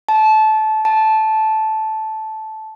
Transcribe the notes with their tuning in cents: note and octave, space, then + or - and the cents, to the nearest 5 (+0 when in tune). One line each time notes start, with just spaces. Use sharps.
A5 -20
A5 -10